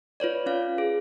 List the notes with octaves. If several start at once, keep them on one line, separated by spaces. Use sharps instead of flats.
F4 B4 C#5 D5
C#4 F5
G#4